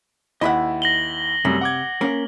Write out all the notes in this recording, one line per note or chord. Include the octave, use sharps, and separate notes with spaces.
D#2 E4 D#5 E5 F#5 B5
A#6 F#7 G7
F#2 C3 G3 A3
F#5 D6 G#6
A#3 C#4 A#4